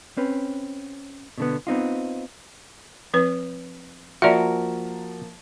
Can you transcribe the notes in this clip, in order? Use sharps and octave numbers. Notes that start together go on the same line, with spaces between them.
C4 C#4 B4
B2 D3 B3
B3 C4 D#4 F4
F3 C4 B4
F3 A#3 F#4 A#4 D5 E5